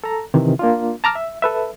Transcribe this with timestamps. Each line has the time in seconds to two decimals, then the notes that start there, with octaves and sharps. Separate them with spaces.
0.04 A4 A#5
0.34 C3 D#3 E3
0.59 A#3 D4 F4
1.04 A5 A#5 D6 F6
1.15 E5
1.42 A4 B4 E5